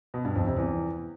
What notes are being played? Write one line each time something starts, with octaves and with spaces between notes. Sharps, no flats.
B2
G2
F2
C3
E2